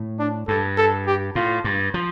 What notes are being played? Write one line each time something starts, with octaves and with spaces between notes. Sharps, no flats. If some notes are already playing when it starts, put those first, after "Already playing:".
Already playing: A2
D4
G2 A4
A4
G4
A2 F4
G2
F3